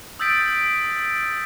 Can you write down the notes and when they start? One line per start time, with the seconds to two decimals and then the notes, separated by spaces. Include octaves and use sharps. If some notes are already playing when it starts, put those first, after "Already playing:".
0.19 D#6 E6 G6 A6 B6 D7